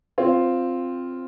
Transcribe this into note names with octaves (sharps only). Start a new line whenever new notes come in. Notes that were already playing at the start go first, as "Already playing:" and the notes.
C4 F4